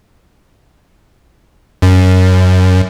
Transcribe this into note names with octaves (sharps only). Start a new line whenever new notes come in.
F#2